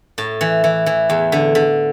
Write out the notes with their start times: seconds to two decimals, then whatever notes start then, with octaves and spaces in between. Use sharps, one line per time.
0.18 A2 A5
0.41 E3
0.64 E3
0.86 E3
1.10 E2
1.32 D3
1.55 D3